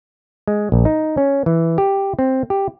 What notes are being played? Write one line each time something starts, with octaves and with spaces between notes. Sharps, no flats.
G#3
A#1
D#4
C#4
E3
G4
C4
G4